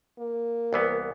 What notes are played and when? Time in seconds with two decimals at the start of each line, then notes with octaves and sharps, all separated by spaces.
0.19 A#3
0.73 C2 E3 B3